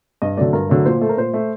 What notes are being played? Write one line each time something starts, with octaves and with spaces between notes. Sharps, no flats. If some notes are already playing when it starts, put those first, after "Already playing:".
G2 D#5
D3 F#3 A3 D5
G2 A#4
D3 F#3 A3
A#2 C5
A3 A4
A#4
A#2 C5
A3